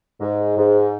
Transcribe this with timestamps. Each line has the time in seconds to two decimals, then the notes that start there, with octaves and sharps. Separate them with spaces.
0.21 G#2
0.57 G#2